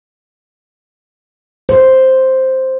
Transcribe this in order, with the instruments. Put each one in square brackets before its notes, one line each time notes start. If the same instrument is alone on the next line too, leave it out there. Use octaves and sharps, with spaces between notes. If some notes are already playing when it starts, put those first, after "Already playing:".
[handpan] C5